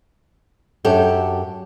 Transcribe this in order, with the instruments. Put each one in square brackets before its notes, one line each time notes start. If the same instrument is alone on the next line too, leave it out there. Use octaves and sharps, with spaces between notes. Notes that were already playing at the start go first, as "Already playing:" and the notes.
[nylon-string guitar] F#2 D4 G4 A4